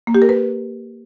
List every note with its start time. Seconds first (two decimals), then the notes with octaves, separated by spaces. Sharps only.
0.07 A#3
0.15 G4
0.22 A#4
0.29 B4